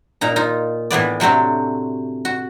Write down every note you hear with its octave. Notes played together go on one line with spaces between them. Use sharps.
A#2 D#4 A#5
D#4 F4
A2 E3 B3 D5
C3 F#3 A3 C4 D4
F#4